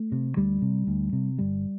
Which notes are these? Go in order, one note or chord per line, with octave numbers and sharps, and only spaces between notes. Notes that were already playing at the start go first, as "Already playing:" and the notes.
Already playing: A3
C3
D2 G3
C3
D2
C3
G1 G3